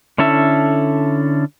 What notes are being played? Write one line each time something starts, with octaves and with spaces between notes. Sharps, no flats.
D3 C#4 E4 A4 E5